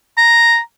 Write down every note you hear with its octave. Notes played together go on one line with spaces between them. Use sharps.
A#5